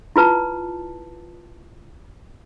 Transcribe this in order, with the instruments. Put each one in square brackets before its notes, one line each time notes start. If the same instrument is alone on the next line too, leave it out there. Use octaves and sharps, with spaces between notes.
[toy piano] E4 F4 B4 A5